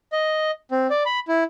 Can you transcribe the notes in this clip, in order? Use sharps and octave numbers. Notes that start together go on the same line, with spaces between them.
D#5
C4
D5
B5
E4